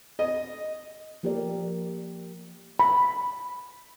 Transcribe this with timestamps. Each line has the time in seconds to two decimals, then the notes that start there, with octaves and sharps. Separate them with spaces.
0.19 D#5
1.23 F3 A#3 G4 A4 A#4 D5
2.79 B5